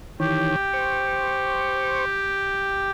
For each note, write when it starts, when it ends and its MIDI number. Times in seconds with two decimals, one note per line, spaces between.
0.20 0.56 51
0.20 0.56 52
0.20 2.91 67
0.20 0.56 73
0.73 2.05 72
0.73 2.05 85